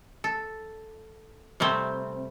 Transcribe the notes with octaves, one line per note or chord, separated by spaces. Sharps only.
A4
C3 G3 A3 C4